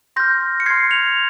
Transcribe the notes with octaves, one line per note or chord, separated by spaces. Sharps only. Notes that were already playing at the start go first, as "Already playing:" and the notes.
C6 F6 G6 A#6
C#7
C6 F6 G#6 C7
C#7 F7